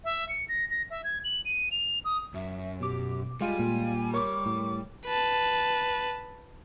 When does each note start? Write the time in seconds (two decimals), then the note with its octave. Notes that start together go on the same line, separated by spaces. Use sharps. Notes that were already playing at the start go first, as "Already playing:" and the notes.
0.04 E5
0.29 C#7
0.49 A#6
0.71 A#6
0.91 E5
1.04 G#6
1.24 F#7
1.45 D#7
1.71 F7
2.05 D#6
2.34 F#2 E5
2.80 B2 G4 D6
3.41 G3 G#3 F4 G#5
3.59 A#2
4.13 A#4 C#5 C#6 D6
4.46 A2
5.06 B4 A5